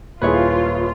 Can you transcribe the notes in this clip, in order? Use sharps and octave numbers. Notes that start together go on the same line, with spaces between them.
D#1 E4 F4 G#4 B4 C#5 C#6